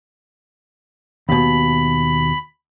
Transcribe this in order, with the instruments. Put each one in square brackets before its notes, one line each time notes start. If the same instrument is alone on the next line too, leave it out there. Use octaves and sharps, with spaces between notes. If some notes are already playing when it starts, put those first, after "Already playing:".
[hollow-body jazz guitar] D#2 B2 [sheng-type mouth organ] B5